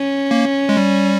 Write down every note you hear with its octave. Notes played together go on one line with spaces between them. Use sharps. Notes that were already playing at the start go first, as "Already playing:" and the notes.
Already playing: C#4
A#3
G#3
G3